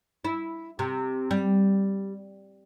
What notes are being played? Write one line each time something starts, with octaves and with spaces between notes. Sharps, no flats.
E4
C3
G3